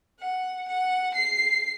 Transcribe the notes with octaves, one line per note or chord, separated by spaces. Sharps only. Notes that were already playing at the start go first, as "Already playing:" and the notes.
F#5
F#5
C7